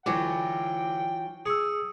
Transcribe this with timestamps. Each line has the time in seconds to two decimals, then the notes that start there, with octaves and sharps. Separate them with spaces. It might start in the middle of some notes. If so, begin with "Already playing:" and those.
0.06 D2 E3 F#3 F4 C#5 G5 D6
1.46 G#4 C#6 D#6 E6